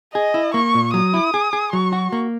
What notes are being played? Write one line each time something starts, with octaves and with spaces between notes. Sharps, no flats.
G#4 D#5
E4
A#3 C#6
A#2
F#3 D#6
E4
G#4
G#4
F#3 C#6
F#4
A#3